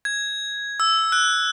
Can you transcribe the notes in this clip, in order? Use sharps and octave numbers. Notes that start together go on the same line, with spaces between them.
G#6
E6
F#6